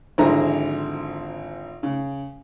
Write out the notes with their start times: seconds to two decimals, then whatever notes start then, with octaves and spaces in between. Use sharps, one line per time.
0.18 G#1 D3 F3 E4 G#4 A#5
1.83 C#3